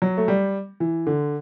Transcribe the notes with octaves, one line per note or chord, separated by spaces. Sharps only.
F#3
A3
G3
E3
D3